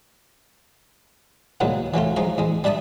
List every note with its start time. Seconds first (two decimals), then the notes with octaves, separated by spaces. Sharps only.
1.60 C2 A#2 D#3 F#3 G#3 B3
1.94 E3 F#3 A3 F4
2.16 F3 G#3 D#4 F5
2.38 E2 G#3
2.64 G3 D4 E5 A5 D#6